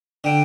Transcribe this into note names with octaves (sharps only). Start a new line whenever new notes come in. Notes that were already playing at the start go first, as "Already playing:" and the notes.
D3 G5